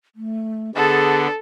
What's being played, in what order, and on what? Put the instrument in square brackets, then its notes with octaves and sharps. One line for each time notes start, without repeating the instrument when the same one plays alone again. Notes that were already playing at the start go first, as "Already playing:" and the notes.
[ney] A3
[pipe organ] D3 B3 D4 [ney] G#4 [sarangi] A4